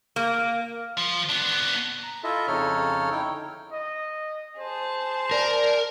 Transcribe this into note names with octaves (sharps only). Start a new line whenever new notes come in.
A#3
F3
B3 D4
A#5
E4 F4 A4 D#5 E5
F2 C#3 D#4 A4 C#5 F6
D#4 E4 G5
D3
D#5
G#4 C5 A5
A#4 D5